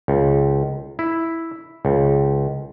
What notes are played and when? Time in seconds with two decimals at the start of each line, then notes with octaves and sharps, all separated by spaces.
0.08 C#2
0.99 E4
1.85 C#2